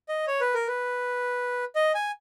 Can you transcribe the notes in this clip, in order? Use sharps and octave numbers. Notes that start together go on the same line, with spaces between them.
D#5
C#5
B4
A#4
B4
D#5
G#5